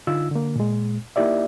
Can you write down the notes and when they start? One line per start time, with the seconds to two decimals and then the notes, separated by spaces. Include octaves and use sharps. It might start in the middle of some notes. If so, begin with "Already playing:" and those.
0.07 D3 D#4 F4 E6
0.31 D3 A#3
0.56 A#2 G#3
1.16 A#3 D#4 E4 G4 D5 E5